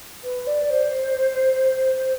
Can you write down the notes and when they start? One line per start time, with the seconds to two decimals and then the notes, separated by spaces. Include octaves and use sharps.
0.24 B4
0.47 D5
0.70 C5